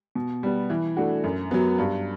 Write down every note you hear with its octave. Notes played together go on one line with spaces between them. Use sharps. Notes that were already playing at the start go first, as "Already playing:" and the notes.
B2
G3 B3
E3
A3 D4 F#4
F#2
F#3 B3
G2